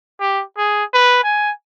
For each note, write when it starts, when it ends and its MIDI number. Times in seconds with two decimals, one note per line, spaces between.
0.20 0.43 67
0.58 0.84 68
0.94 1.21 71
1.24 1.51 80